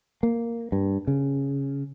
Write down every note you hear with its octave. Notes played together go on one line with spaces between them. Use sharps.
A#3
G2
C#3